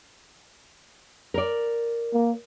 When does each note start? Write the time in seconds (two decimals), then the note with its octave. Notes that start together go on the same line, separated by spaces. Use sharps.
1.34 A#4 D5
2.14 A#3